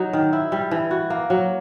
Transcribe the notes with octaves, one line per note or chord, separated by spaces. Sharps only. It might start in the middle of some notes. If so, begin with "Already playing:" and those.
Already playing: F#3 D#4
D#3
E4
G3
E3
F#4
A#3
F#3